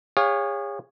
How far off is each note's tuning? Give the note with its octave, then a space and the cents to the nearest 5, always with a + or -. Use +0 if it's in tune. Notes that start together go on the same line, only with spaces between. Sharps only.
G#4 -40 C#5 +0 F5 +15